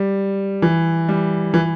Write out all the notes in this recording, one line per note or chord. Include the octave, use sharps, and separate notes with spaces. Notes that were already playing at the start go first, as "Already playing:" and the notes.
Already playing: G3
E3
G3
E3